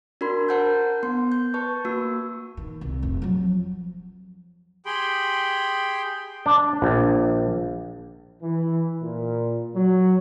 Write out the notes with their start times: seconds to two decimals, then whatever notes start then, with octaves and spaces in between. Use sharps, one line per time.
0.21 D4 F#4 A#4 B5 C6
0.49 A#4 C5 F#5 A5 G6
1.03 B3 C6
1.32 G6
1.54 B4 A5 C#6
1.85 A#3 F#4 E6
2.57 D#3
2.81 C2
3.03 F1
3.22 F3 F#3
4.86 G4 G#4 G5 B5 C6
6.46 D4
6.82 A#1
8.42 E3
9.02 A#2
9.76 F#3